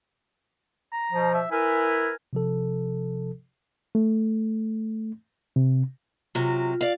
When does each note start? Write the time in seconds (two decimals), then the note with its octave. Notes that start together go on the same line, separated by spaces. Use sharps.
0.92 A#5
1.12 B2 F3
1.34 E5
1.51 E4 A#4 B4 G#5
2.33 C3 F3 A4
3.95 A3
5.56 C3
6.35 C3 F#3 F4
6.81 D5 F5